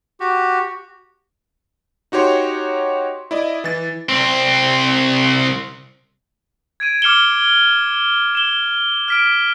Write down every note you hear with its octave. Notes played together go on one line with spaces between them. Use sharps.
F#4 G4
D#4 F#4 G4 C#5 C6
E4 D5 D#5
E3 A6
C2 C4
G#6 D7 D#7
D6 F6 C#7 E7 G7
E7 G7
F6 B6 D7